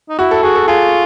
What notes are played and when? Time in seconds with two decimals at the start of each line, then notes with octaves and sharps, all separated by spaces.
0.09 D#4
0.19 E4 F#4
0.31 A4
0.43 F#4 G#4
0.55 A4
0.68 F4 G#4